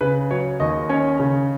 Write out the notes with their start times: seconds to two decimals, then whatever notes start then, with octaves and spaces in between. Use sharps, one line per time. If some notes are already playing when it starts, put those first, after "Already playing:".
0.01 C#3 B4
0.31 F#3 C#5
0.60 D#2 D#5
0.89 C#4 C#5
1.20 C#3